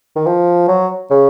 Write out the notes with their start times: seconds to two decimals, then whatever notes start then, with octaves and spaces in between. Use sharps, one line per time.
0.16 D#3
0.26 F3
0.68 F#3
1.11 C#3